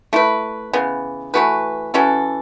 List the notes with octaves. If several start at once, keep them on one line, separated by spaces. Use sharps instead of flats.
A3 E4 B4
C#3 E3 B3
E3 A3 F#4 B4
E3 C#4 F#4 A4